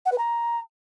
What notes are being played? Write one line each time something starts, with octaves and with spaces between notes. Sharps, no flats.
F#5
B4
A#5